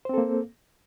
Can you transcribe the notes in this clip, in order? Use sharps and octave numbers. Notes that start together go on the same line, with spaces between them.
A#3 C4 A4 C5